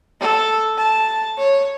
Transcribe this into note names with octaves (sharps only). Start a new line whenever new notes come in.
A4
A5
C#5